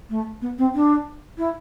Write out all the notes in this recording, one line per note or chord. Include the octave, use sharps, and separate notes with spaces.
A3
B3
C4
D4
E4